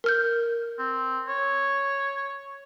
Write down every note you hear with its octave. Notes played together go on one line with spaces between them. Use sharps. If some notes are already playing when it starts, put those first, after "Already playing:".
A#4 F6 G6
C4
C#5